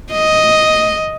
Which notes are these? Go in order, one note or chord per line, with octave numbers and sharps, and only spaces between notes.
D#5